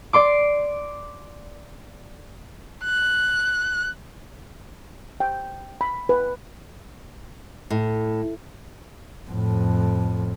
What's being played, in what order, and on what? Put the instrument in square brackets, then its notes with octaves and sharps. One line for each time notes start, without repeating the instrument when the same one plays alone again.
[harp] D5 C6 D6
[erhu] F#6
[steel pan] G5
B5
B4
[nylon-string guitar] A2
[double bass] F2 A2